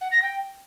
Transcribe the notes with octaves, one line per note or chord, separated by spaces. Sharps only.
F#5
A#6
G5